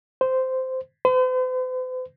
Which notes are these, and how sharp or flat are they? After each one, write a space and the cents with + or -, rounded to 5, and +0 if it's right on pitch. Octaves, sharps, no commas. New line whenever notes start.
C5 -10
C5 -45